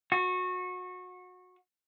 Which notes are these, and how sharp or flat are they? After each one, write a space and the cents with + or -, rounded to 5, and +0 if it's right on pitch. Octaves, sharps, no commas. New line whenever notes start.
F#4 -25